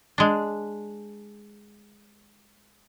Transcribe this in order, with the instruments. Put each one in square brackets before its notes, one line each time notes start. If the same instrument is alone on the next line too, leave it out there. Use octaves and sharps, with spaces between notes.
[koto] G#3 D4